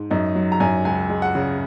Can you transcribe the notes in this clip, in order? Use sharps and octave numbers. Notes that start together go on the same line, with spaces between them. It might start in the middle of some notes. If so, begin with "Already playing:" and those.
Already playing: G#2
F#2 D#4
F#3
A#5
F#2 G#5
C#2 G#5
G#3
F#5
C#3